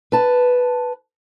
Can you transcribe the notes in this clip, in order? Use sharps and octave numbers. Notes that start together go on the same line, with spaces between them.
B4 A5